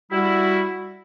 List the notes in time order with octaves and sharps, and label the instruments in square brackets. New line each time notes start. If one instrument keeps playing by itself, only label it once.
[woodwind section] G3 E4 [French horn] F#4